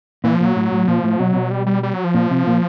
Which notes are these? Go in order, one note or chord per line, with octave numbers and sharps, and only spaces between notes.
A#2 E3
F3
A#2 F#3
A2
A2
A#2 F3
A2
B2 F#3
B2
G3
G3
G3
F#3
F3
A#2
C3
A#2